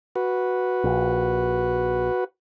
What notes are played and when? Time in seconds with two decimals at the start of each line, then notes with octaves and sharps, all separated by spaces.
0.16 F#4 B4
0.84 A#1